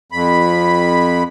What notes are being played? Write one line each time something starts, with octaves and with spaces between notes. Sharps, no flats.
F2 B5